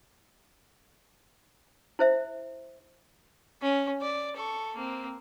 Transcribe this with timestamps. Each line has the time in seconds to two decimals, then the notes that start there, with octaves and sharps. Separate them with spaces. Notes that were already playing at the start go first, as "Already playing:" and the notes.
1.99 E4 C5 E5
3.61 C#4
4.01 D5
4.36 A4 C#6
4.75 A#3 C4